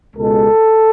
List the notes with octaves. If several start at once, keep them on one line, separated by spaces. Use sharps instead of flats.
C#2 B2 G#3 A4